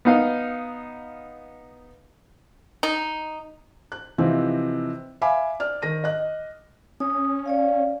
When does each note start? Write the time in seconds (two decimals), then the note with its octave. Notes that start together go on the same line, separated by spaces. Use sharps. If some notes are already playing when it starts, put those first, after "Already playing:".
0.05 B3 D#4 F5
2.83 D#4
3.92 F#6
4.18 C3 E3 F3 C4 D#4 F4
5.22 E5 F5 G#5 B5 D6
5.60 D5 F6
5.82 D#3 A#6 D#7
6.04 D#5 F#6
7.00 C#4 D#6
7.46 C#5 D5 F5